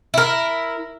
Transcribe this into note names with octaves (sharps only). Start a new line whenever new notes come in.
E4 A#4